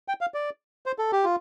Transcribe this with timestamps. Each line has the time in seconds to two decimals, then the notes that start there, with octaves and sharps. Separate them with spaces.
0.08 G5
0.21 F5
0.34 D5
0.86 C5
0.99 A4
1.12 G4
1.24 F4